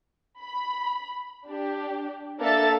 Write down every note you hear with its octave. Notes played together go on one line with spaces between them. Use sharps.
B5
D4 G4
A#3 D4 A4 E5 A5 A6